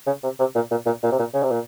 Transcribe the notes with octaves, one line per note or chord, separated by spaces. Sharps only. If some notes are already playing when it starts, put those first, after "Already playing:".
C#3
C3
C3
A#2
A#2
A#2
A#2
C3
A#2
C#3
C3
A#2